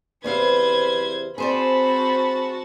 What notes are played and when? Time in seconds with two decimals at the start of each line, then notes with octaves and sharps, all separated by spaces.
0.24 E2 C3 B4 C5 F5 G#6
1.38 C4 F#4 G#4 C5 D5 A5 B5